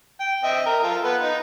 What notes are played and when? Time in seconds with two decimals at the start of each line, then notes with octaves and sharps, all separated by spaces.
0.20 G5
0.44 C4 D#5 E5
0.66 A#4
0.83 F4 A4
1.04 B3 B4
1.22 D#4